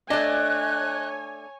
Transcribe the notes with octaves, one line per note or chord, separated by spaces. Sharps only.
A3 D4 C#5 D#5 G#5 F#6